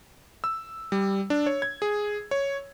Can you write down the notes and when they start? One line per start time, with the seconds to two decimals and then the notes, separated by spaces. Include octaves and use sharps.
0.44 E6
0.92 G3
1.30 D4
1.46 C#5
1.62 G#6
1.82 G#4
2.31 C#5